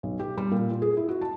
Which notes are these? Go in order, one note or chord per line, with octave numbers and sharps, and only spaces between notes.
B1
G4
G3
A#2
F4
G#4
E4
F#4
A5